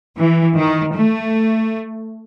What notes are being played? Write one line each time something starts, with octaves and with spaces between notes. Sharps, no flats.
E3
D#3
A3